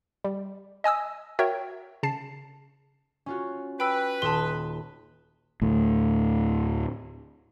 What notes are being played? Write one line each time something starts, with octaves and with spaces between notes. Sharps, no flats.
G3
D#5 G#5 D#6 E6
F#4 A#4 C#5 E5 G5
C#3 A5 C7
C#4 F4 F#4
B4 G5 B5 E6
D#1 A5 C6 D#6
D2 A2